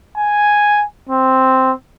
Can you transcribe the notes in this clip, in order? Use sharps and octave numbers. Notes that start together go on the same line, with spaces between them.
G#5
C4